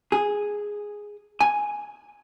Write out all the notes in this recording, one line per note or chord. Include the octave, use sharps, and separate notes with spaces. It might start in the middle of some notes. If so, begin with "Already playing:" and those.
G#4
G#5